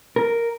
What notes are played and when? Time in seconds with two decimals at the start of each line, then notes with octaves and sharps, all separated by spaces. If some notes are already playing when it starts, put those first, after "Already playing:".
0.16 A#4